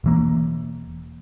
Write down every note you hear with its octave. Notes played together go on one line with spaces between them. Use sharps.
E1 E3 A#3